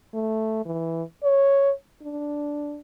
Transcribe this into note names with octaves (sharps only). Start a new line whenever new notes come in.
A3
E3
C#5
D4